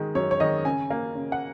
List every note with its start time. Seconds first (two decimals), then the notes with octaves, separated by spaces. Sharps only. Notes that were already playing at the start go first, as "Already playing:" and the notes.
Already playing: D#3 G#3
0.15 F#2 C#5
0.31 C#5
0.40 D#3 G#3 D#5
0.65 C#3 G#5
0.90 A#3
1.15 C#3
1.32 F#5